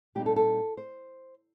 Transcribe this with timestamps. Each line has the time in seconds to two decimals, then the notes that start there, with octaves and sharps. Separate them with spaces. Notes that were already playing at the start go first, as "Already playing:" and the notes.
0.15 A#2 G3 C4 D#4 G4
0.26 A4
0.36 A4
0.77 C5